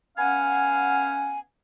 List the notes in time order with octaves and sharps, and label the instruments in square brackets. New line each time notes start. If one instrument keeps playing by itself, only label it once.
[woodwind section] B3 C#4 F5 F#5 G#5